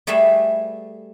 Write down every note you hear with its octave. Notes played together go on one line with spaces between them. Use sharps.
G3 A3 G#4 B4 E5 F5